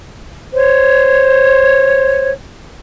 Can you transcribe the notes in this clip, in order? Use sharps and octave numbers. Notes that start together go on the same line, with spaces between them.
C5 C#5